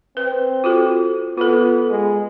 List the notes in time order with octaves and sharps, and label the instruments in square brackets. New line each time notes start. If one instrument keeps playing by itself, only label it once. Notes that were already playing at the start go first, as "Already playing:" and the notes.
[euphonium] C4 [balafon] B4
[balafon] F4 F#4 A4
[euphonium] B3 [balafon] F4 A4
[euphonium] G#3